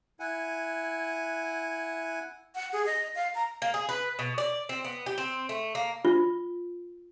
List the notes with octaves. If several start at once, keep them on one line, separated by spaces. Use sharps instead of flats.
E4 F#5 G#5
F#5
G#4
D#5
F5
A#5
A#3
G#4
B4
B2
D5
C4
B3
G4
C4
A3
A#3
F4